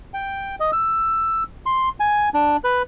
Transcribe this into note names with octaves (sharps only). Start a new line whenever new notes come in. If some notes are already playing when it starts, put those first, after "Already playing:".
G5
D#5
E6
C6
G#5
D4
B4